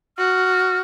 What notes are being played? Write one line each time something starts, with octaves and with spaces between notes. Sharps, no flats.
F#4 F6